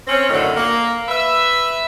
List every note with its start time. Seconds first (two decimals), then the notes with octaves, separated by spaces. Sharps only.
0.08 C4 C#4
0.30 F#2 A2 D3 D#3
0.56 A#3
1.09 B4 E5